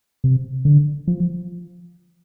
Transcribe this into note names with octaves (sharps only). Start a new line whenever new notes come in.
C3
D3
F3